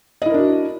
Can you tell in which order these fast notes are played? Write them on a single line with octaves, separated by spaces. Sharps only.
D#5 E4 A#4 D4 F#4